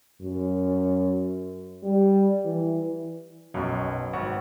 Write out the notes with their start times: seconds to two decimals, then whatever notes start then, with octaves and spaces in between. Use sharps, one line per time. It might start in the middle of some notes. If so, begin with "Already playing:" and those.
0.21 F#2
1.84 G3
2.45 E3
3.54 B1 F#2 B2
4.13 G#1 F#5 C#6